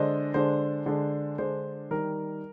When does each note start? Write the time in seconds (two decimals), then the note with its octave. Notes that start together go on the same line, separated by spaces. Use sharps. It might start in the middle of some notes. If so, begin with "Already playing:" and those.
Already playing: D3 G#3 D4 C5 D#5
0.34 D3 G#3 D4 C5
0.86 D3 G#3 D4
1.38 D3 G#3 D4 C5
1.91 D#3 G3 A#4